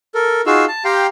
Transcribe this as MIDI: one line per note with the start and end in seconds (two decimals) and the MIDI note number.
0.15 0.41 69
0.15 0.41 70
0.46 0.65 63
0.46 0.65 65
0.46 0.65 66
0.46 0.65 68
0.46 0.65 77
0.46 0.65 88
0.68 0.83 81
0.85 1.07 67
0.85 1.07 77
0.85 1.07 79
0.85 1.07 82
0.85 1.07 84